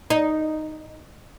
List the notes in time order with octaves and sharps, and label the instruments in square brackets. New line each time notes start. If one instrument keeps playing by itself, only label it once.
[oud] D#4